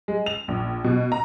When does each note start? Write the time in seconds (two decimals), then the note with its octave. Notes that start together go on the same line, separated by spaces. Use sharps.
0.08 G#3
0.26 F7
0.48 A#1
0.84 B2
1.12 A#5